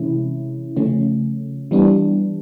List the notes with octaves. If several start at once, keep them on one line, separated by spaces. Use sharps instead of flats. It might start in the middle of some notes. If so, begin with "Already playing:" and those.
Already playing: C3 E3 G#3 C#4 E4
C#3 F3 A3 C#4
E3 G3 B3 D4